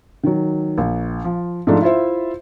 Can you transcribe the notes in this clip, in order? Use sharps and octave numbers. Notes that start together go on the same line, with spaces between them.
D#3 F#3
A#1
F3
G#2 F3 A3 D4 F4
E4 F4 C5 E5